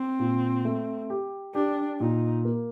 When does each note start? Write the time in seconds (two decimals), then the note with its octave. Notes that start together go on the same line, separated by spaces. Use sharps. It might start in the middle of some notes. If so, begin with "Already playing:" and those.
Already playing: C4
0.19 A#2
0.65 A3
1.10 G4
1.54 D4 G4
2.00 A#2 D#4
2.45 A#3